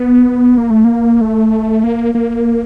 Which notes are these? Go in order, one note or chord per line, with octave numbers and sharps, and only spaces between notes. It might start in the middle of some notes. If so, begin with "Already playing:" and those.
Already playing: B3
A#3
A3
A#3
A3
A#3
A#3